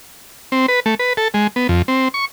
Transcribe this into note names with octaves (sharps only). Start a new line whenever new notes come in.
C4
B4
A3
B4
A4
G#3
B3
F2
C4
C#6